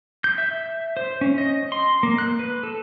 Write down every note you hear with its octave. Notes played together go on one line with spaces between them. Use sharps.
G6
E5
C5
C#4
D#5
C6
A#3
F#6
B4
A4